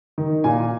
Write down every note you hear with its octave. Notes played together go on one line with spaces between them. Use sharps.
D#3
A#2 G#5